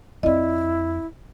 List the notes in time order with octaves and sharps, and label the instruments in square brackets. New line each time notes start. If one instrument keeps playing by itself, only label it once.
[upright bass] F2 C4 [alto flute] E4 [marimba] D5 D#5